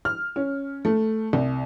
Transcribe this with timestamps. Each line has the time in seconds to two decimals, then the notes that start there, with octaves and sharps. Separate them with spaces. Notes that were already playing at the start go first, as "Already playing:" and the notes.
0.05 F6
0.36 C#4
0.85 A3
1.33 C2